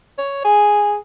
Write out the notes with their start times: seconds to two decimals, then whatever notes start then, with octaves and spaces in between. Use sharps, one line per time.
0.18 C#5
0.45 G#4